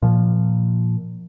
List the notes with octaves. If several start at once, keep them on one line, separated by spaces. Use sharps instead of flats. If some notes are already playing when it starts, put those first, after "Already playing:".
A#2 F3